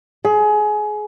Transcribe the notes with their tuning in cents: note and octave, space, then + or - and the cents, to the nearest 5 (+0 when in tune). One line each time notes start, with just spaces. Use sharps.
G#4 +25